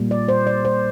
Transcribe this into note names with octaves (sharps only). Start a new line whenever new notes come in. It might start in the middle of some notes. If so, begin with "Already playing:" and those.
Already playing: A#2 G3 A#3
D5
C5
D5
C5